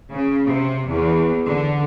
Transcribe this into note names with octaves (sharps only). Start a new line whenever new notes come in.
C#3
C3
E2
D3